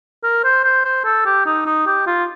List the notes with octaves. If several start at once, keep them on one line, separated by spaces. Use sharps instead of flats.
A#4
C5
C5
C5
A4
G4
D#4
D#4
G4
F4